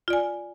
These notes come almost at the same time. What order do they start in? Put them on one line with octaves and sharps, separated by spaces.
F4 D5 G#5